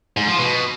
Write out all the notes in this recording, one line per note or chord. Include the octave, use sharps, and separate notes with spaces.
G#2
F3
B2